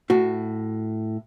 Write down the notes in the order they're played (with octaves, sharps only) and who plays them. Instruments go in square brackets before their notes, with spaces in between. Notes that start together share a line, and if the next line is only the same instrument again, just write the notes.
[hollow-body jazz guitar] A2 F#4